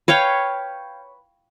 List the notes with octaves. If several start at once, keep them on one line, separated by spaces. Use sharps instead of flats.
B4 C#5 F5 G5